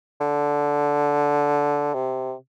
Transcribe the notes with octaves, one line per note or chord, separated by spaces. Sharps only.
D3
C3